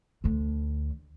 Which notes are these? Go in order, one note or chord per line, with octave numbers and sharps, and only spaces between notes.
D2 D3